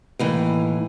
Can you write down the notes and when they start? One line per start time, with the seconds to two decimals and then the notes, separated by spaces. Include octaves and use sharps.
0.19 D#2 A2 E3